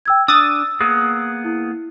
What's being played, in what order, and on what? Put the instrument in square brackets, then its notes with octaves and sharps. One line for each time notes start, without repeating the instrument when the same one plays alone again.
[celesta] G5 E6 G#6
[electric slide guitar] D4 [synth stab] D#6 A6 [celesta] E6
[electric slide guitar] A#3 B3 G#4
[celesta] E4